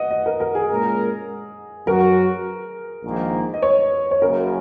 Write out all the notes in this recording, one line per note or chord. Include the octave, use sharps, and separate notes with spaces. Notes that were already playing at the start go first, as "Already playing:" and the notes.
Already playing: D#5 F#5
D#5
A#4
A#4
G#4
A#2 G#3 C#4 A#4
F#2 F#3 C#4 F#4 A#4
A#1 G#2 D#3 A#3
D#5
C#5
C#5
F#1 F#2 C#3 A#4